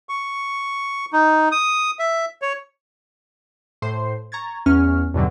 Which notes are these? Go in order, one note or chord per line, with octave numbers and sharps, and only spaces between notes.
C#6
D#4
D#6
E5
C#5
A2 C5 C6 C7
A#5 C#6 G#6 A6
E2 C#4 F6
E2 G2 B2 D3 F#3